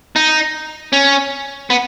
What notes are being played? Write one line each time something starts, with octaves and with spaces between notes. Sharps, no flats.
D#4
C#4
B3